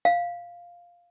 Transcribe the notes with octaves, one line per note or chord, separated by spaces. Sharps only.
F5